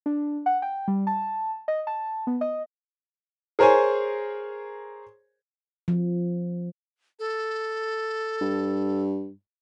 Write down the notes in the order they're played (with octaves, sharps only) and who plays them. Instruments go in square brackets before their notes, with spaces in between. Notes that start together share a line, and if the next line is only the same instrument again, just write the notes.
[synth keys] D4
F#5
G5
G3
A5
D#5
A5
B3
D#5
[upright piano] G#4 A#4 C5 C#5 G#5
[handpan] F3
[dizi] A4
[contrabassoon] G2